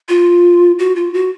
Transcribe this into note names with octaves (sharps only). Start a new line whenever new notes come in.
F4
F#4
F4
F#4